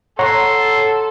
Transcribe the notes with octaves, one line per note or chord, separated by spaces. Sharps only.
A4 C#5 F#5 A#5 C6